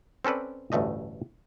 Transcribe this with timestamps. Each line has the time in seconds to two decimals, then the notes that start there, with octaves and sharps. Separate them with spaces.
0.25 C4 C#4 A4 B4 D5
0.72 A1 D2 G2 A3 D#5